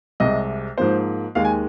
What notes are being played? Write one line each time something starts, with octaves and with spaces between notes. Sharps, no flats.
C2 C3 G#3 D#5
G#2 F3 A#3 C5
D#2 D#3 G#3 F5
G#5